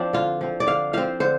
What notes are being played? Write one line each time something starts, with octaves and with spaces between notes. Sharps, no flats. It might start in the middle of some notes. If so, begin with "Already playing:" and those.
Already playing: F3 C4 D4
D3 F4
F3 C4
D5
D3 F5
F3 C4 F5
D3 C5